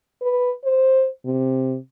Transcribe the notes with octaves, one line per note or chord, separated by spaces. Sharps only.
B4
C5
C3